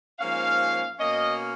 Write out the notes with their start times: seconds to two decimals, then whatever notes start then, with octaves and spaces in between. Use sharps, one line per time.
0.19 G#2 F3 A#3 C#4 F5
0.99 B2 A#3 C#4 D#5